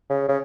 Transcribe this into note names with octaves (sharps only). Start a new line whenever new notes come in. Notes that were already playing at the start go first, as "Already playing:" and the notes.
C#3
C#3